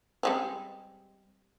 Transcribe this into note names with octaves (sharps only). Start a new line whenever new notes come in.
G3 G#3 C4